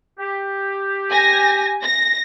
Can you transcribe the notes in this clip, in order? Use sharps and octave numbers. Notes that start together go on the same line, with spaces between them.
G4
G#5 A#6
A#6